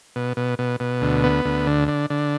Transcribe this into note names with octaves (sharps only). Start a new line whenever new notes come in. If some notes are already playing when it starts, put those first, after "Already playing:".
B2
B2
B2
B2
D2
B3
D2
D3
D3
D3